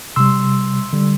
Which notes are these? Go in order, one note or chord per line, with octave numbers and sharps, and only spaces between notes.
C3 G3 C6 E6
D3 G3